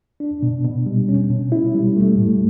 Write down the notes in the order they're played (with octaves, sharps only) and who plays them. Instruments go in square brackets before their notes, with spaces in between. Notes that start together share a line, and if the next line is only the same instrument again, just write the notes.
[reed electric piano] D4
B2
B2
G3
C#4
B2
E4
G3
A3
A2